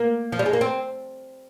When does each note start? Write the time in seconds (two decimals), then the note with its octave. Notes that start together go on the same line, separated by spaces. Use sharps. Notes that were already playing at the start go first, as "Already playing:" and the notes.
Already playing: A#3
0.32 F3
0.39 G3
0.46 G#3
0.53 A#3
0.61 C4